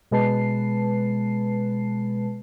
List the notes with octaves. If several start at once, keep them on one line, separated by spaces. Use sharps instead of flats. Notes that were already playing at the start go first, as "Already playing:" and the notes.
B2 G#3 B4 A5 C7